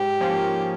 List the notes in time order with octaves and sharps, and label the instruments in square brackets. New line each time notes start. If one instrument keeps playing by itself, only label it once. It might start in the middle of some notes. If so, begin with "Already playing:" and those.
Already playing: [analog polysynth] G#2 [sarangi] G4
[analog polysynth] F3 A#3 C#4